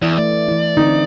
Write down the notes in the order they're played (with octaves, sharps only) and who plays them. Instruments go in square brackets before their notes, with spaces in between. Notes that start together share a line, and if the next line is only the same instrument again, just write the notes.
[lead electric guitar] E2 [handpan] E3 E4 D5
[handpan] A3 [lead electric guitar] D5
[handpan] E3 E4
[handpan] D3 C4 [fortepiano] D#4